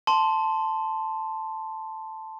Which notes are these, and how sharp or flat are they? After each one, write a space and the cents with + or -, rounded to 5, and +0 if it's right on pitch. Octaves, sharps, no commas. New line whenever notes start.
A5 +0 C6 +0